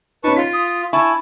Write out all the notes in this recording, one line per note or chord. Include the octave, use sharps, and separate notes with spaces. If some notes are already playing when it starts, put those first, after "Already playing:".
C#4 D#4 B4 A5 C#6
F4 B6
D#6
E4 G#5 A5 C#6